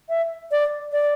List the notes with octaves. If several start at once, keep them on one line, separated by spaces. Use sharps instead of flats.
E5
D5
D5